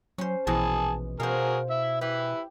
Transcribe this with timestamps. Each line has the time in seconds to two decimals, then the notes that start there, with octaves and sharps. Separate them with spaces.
0.18 F#3 C#4 C5
0.47 A#1 B2 E3 G#3 G#4 A5
1.20 B2 F#4 G#4 A#4 C5 F5
1.70 E4 E5
2.01 E4 G4 B4